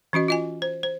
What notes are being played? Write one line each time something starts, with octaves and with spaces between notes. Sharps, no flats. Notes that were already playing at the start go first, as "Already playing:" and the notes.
E3 C#4 F#4 D#5
F4 D#5 G#5
C5
C5